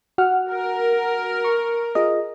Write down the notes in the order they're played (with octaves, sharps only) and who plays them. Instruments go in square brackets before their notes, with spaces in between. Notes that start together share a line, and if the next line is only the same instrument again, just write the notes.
[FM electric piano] F#4 F#5 F6
[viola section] A#4
[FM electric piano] C#6
F4 G#4 D#5